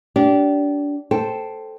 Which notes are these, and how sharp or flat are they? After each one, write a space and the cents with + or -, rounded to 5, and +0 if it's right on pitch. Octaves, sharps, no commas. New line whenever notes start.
D4 -25 G4 -25
A4 +0 C5 +0 G5 +0